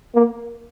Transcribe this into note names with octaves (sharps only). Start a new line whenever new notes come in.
A#3